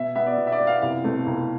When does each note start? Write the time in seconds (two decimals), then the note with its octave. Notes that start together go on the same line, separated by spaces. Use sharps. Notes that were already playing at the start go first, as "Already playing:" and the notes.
Already playing: B2 E5
0.15 B3 E5
0.26 D5
0.38 B2
0.47 E5
0.52 D5
0.60 B3
0.67 F5
0.82 C2 F5
1.04 B2 A3 C4
1.26 C2